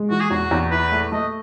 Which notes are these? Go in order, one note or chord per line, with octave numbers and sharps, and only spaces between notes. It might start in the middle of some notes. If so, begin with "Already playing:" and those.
Already playing: G#3
E3 F#4
G#4
E2 F#4
E2
E4 B4
A3
A3 D#5